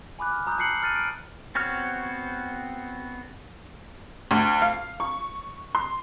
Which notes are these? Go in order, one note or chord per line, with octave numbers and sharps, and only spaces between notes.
G#5 B5 D6 F#6
F6
A#5 D#6 E6 F#6 G6
A5 A#5 F#6 C7 C#7 F#7
F6 A6 D#7
F6 D7
B3 C4 F#4 C#5 F6
D2
F5
C#6
C6